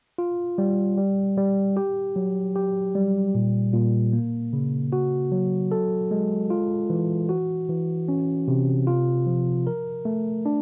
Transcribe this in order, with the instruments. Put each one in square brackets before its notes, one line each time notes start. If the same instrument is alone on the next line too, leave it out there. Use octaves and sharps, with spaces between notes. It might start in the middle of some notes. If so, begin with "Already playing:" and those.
[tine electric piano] F4
G3
G3
G3
G4
F#3
G4
G3
A#2
A#2
A#3
C#3
F#4
F#3
A4
G#3
F4
E3
F#4
E3
C#4
C3
F4
F3
A#4
A3
D4